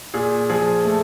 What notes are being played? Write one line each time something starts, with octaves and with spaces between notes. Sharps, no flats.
A#2 G#4
F3 G#4
A3